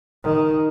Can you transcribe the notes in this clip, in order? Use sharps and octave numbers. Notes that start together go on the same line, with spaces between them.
D#3